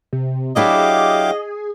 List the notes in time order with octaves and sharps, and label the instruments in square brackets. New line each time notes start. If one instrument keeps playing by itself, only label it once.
[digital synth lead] C3
[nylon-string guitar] F#3 D4 E4 [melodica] G4 F5 D6 [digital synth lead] G#4 [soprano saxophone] D#5